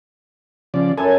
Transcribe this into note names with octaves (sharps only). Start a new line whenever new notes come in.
C#3 F3 D5
F#2 A4 G#5